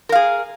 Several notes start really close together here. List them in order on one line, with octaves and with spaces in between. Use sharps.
A#4 F5 G#4